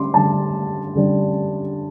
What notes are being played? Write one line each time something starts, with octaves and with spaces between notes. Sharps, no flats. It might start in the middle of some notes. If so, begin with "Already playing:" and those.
Already playing: D3 G3 D4 C6 D6
D3 G3 D4 A5
D3 G3 D4